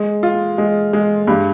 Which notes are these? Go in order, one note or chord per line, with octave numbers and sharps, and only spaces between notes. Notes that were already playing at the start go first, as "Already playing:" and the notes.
Already playing: G#3
F4
G#3
G#3
G2